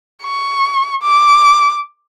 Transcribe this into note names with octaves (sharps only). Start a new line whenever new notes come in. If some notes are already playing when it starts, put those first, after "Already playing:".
C#6
D6